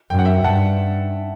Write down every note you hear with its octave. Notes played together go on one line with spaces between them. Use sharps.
F#2 G5
F#5
E5 G5
G2 F#5 A5